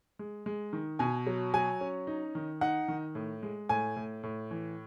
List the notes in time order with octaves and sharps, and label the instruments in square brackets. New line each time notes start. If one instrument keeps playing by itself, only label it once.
[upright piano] G#3
G#3
D#3
B2 G#5
F#3
F#3 G#5
C#4
D#4
D#3
D#4 F#5
D#3
A2
G#3
A2 G#5
A2
A2
E3